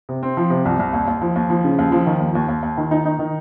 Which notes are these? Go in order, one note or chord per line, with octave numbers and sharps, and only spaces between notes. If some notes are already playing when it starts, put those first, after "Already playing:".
C3
C4
F3
C3
C2
C2
D#2
D#2
F3
D#2
F3
C#3
D#2
F3
D#3
D#2
D#2
D#2
D#2
D#3
D#4
D#4
D#3